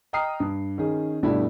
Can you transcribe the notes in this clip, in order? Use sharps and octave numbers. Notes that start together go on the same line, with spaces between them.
D#5 G5 A#5 D#6 F6 C7
G2
D#3 C#4 D#4 G#4
G2 B2 G3 A3 D4 E4